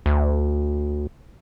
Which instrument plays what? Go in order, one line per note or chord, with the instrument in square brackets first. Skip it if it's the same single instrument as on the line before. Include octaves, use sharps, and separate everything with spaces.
[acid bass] D2